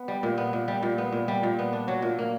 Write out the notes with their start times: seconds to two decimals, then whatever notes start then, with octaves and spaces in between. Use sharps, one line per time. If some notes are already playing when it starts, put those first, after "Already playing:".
Already playing: B3
0.08 G3
0.23 A#2
0.38 B3
0.53 A#2
0.68 G3
0.83 A#2
0.98 B3
1.12 A#2
1.28 G3
1.43 A#2
1.59 B3
1.73 D4
1.88 F#3
2.02 A#2
2.19 A#3